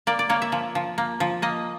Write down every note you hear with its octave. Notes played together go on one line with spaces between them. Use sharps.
A#3 D5
D5
A#3 C#5
E5
F3
F3
A#3
F3
A#3 D#5